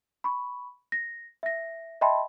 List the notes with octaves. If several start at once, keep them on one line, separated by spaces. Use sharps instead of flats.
B5 C#6
A#6
E5 A#6
D#5 E5 G5 A5 B5 C6